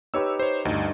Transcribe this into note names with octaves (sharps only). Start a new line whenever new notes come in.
D#4 G4 B4 C#5 E6
C5 C#5
D2 G2 D#4